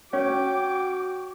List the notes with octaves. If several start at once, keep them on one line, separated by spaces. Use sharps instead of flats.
C#4 F#4 G5 D6